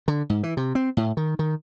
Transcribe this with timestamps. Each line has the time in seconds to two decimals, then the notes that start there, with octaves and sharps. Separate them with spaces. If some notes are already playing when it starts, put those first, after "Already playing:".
0.08 D3
0.30 G#2
0.43 E3
0.57 C3
0.75 C4
0.97 A2
1.17 D#3
1.39 D#3